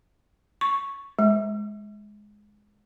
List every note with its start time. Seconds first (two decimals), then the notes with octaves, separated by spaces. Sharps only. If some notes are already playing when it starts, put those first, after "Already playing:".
0.61 C#6
1.19 G#3